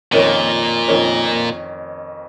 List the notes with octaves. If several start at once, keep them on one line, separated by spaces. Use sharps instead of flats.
F2 A#2 D#3 C#4 A#4 C#5
F2 D#3 C#4 A#4 C#5